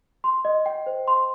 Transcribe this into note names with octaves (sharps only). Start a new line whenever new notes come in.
C6
D#5
G5
C5
C6